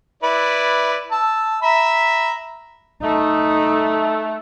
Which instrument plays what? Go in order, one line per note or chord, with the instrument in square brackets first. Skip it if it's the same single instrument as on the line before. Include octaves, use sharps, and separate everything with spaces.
[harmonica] E4 B4 D5
A5 E6
E5 A#5 B5
[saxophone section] A3 [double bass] D#4